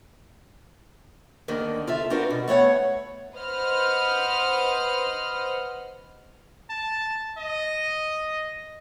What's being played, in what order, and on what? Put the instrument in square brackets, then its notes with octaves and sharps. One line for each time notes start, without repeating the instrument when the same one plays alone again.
[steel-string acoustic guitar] D2 D3 D#3 A#3
F4 A4 E5
C4 D4 F4 F#4 A#4 B4
B2
A3 B3 C#5 F#5
[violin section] B4 C5 D#5 F#5 F6
[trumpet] A5
D#5